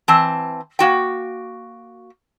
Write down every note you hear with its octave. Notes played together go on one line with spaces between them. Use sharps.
E3 C4 A5
A#3 F#4 G5